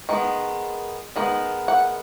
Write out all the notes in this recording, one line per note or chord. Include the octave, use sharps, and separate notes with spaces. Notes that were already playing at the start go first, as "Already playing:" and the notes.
D#3 G#3 B3
D#3 G#3 B3
F#5